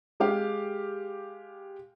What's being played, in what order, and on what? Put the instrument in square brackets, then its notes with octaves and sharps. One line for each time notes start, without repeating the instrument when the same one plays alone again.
[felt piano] G#3 G4 F5